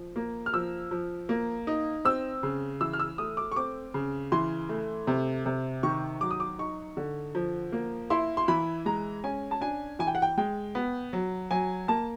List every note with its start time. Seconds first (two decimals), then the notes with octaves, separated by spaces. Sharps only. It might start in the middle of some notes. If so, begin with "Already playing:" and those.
Already playing: F3
0.16 A#3
0.46 F6
0.54 F3 E6
0.91 F3
1.29 A#3
1.67 D#4
2.05 C4 E6
2.43 C#3
2.81 E3 E6
2.93 F6
2.99 E6
3.18 A3 D#6
3.37 D6
3.52 C#6
3.56 C4 D6
3.94 C#3
4.32 E3 C6
4.69 A3
5.07 C3
5.46 C3
5.83 D#3 C#6
6.21 F#3 D6
6.31 D#6
6.40 D6
6.59 D#4 C#6
6.97 D3
7.35 F3
7.72 A#3
8.10 E4 C6
8.37 C6
8.48 E3 B5
8.86 G#3 A#5
9.24 C#4 G#5
9.51 A5
9.61 D4 G#5
9.99 E3 G#5
10.07 G5
10.15 F#5
10.22 G5
10.37 G#3 G5
10.75 B3
11.13 F#3
11.51 F#3 G#5
11.88 A#3 A5